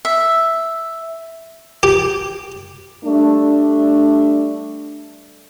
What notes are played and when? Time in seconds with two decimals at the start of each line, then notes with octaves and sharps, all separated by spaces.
0.05 E5
1.83 G4
3.05 G3 A3 D4